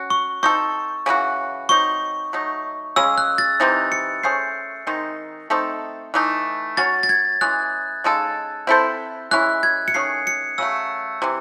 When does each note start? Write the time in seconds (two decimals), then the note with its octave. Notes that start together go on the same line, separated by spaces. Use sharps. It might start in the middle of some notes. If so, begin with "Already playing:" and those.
Already playing: C#4 F#4
0.10 C#6
0.43 C4 D#4 A4 C#6
1.06 C#3 E3 C4 F#4
1.69 F#3 C4 D#4 C#6
2.33 F#3 A3 D#4
2.96 C#3 G#3 C#4 G#4 E6
3.18 F#6
3.38 A6
3.60 C3 E3 C4 D#4
3.92 C#7
4.23 A3 C#4 G#4 C5 C7
4.87 D#3 G#3 C4 D#4
5.50 A3 C4 D#4 A4
6.14 E3 A3 D#4
6.77 F#3 C#4 F#4 C#5 A6
7.03 A6
7.09 G#6
7.41 E3 G#3 C#4 G#4 F#6
8.04 C#3 G#3 D#4 A4
8.67 C4 E4 A4 C5
9.31 E3 G#3 C#4 E4 F#6
9.63 G#6
9.88 C#7
9.94 D#3 A3 C#4 G#4 C7
10.27 C#7
10.58 C#3 F#3 A3 E6
11.22 C3 E3